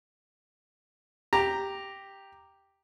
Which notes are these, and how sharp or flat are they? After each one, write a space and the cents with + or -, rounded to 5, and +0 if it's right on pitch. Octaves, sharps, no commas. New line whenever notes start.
G4 +0 A#5 -5